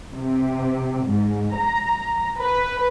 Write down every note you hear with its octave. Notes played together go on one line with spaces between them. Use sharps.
C3
G#2
A#5
B4